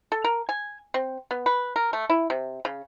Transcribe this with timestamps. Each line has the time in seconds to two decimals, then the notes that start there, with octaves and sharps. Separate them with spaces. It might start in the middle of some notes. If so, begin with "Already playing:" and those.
0.12 A4
0.24 A#4
0.49 G#5
0.94 C4
1.31 B3
1.46 B4
1.76 A#4
1.93 A3
2.10 E4
2.30 C3
2.65 C#3